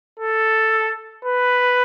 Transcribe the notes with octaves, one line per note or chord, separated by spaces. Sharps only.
A4
B4